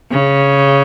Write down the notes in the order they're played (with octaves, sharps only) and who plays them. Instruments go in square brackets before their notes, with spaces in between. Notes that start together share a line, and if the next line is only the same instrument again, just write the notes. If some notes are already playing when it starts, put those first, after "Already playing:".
[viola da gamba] C#3